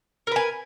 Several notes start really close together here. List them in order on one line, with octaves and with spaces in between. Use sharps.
A#4 B4 G#5